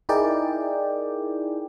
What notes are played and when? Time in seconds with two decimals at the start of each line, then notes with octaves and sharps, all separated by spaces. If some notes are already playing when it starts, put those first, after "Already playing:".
0.09 D#4 E4 G#4 A#4 D5 G5